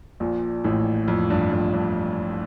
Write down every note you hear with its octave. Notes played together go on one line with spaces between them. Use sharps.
A#1 A#2
A1 A2
F2
G2
F2
G2